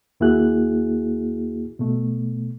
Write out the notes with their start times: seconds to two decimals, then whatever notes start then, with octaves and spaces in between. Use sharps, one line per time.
0.20 D#2 A#3 E4 F#4 G#4 F#6
1.79 B2 A3